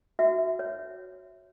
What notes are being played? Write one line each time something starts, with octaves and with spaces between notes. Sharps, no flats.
F#4 E5
C#5